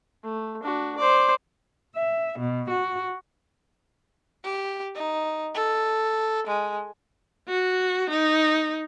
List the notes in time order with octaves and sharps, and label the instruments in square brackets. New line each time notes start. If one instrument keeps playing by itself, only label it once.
[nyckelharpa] A3
D4 F#4
C5 D5
[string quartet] E5
B2
F#4
[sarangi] G4
D#4
A4
G#3
[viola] F#4
D#4